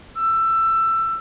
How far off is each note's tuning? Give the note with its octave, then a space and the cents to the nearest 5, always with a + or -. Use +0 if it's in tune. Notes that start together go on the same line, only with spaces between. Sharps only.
E6 +15